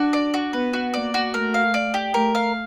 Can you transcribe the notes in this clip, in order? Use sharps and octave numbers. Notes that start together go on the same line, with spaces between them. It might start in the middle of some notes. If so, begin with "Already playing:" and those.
Already playing: D4 F#4
D5
F#4
B3 B4
F#4
A#3 D5
F#4
A3 A#4
F5
D5
G4
A3 A#4
F5